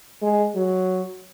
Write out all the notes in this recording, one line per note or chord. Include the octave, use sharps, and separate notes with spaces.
G#3
F#3